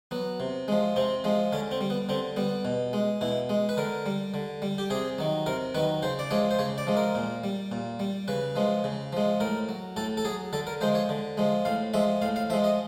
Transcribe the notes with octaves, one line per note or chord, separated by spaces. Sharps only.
F#3 B3
C3
F3 G#3
C3 C4
F3 G#3
D3 C#4
C4
G3
B3
D3 C4
G3 B3
B2
G#3
B2 E4
G#3
B4
D3 A#4
G3
D3
G3
G4
C3 G#4
D#3 F#3
C3 A#4
D#3 F#3 B4
C#3 C5
D5
F3 G#3 C#5
C5
C#3 C#5
D5
F3 G#3
A#4
A#2
G3
A#2
G3
C#3 B4
F3 G#3
C#3
F3 G#3
A2 A#4
F#3
A2 A4
A4
F#3 G#4
D3 A4
A#4
F3 G#3 C5
C#5
D3
F3 G#3
A2 F5
F3 G#3 E5
A2 F5
F5
F3 G#3 E5
D#5